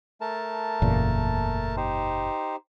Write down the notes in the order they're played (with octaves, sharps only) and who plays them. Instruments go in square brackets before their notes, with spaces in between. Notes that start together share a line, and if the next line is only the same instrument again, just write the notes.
[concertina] A3 A#4 A5
[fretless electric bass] F#1 E2 A#2
[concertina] D#4 G4 C5